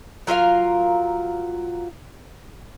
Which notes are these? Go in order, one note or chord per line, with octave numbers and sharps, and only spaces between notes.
F#3 F4 A#4 F5